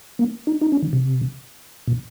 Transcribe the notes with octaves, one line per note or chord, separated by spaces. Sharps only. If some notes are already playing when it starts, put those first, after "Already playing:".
A#3
D#4
D#4
C#4
D#3
C3
A#2